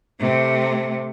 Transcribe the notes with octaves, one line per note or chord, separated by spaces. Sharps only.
C3 A3